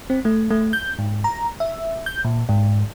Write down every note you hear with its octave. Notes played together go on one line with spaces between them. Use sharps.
C4
A3
A3
G6
G#2
A#5
E5
G6
A#2
G#2